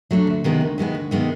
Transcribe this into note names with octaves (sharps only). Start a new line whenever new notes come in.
F#3 A3 D4
D2
C3 D#3 G#3 B3
D2
C3 D#3 G#3 B3
D2
C3 D#3 G#3 B3